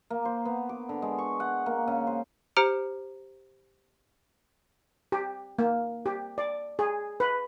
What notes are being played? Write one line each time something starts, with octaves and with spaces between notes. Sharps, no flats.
A#3
C5
B3
D6
D3
G#3
C#6
F#5
A#3
C#3
C5
G4 C5 A#5 F6 C#7 D7
G4
A#3
G4
D5
G#4
B4